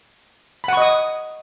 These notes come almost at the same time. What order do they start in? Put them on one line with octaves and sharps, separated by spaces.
B5 F#5 C#6 D#5 D#6